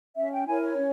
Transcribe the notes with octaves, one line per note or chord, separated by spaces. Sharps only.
C#4 E5
G5
E4 A#4 C#5 G#5
C#5
C#4